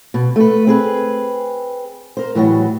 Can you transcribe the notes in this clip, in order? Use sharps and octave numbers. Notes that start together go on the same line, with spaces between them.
B2
A3 B4
C4 G#4 B4
A#4 C5
A2 E3 F#3 G3 F#4